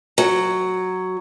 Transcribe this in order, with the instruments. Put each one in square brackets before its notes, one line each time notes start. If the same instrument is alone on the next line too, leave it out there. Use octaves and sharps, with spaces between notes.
[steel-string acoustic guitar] F#3